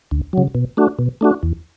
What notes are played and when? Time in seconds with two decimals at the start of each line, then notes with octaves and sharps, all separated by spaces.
0.11 D2
0.33 C#3 F#3
0.55 B2
0.77 A3 D4 F#4
0.99 B2
1.21 A3 D4 F#4
1.43 E2